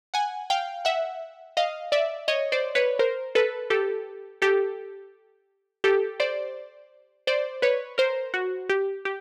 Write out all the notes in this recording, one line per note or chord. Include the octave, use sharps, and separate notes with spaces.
F#5 G#5
F5 G5
E5 F#5
D#5 F5
D5 E5
C#5 D#5
C5 D5
B4 C#5
A#4 C5
A4 B4
G4 A4
G4 A4
G4 A4
C5 D5
C5 D5
B4 C#5
A#4 C5
F#4
G4
G4